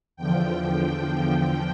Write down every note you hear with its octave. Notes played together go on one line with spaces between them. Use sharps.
E2 D3 F3 G5